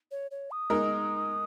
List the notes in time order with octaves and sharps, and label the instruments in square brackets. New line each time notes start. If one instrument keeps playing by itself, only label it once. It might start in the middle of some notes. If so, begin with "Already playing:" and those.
[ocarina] C#5
C#5
D#6
[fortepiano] G#3 D#4 A#4